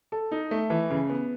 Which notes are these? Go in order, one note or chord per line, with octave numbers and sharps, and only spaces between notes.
A4
D#4
A3
E3
C#3
B3